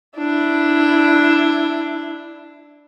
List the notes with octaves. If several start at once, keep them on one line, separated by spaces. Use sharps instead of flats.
D4 E4